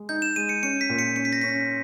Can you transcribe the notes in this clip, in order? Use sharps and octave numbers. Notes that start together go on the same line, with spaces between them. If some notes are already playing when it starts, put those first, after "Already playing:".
Already playing: G#3
D#4 G6
E7
G#3 D#7
C#7
C#4 C#7
B6
A#2
C#7
C#4 C#7
B6
A#6
C#4 B6